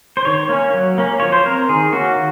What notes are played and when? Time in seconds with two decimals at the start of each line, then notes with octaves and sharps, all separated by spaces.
0.17 C5
0.25 D#3 C#5
0.49 A#3 C#4
0.74 F#3
0.98 A#3 C#4
1.20 F3 C#5
1.32 C5
1.45 C4 A#4
1.69 D#3 G#4
1.93 A#3 C#4 F#4
2.16 D#3